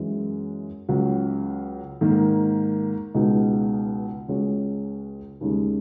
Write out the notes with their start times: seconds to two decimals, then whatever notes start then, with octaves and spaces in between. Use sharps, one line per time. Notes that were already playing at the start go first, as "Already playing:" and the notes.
Already playing: F#2 E3 G#3
0.89 C#2 C#3 F#3
2.01 G#2 D#3 A#3
3.14 C#2 B2 G#3 B3 D#4
4.28 C#2 C#3 G#3 C#4 F#4
5.41 D#2 C#3 G#3